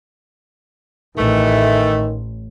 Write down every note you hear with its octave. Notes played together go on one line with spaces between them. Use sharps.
A1 D#3 E3 A3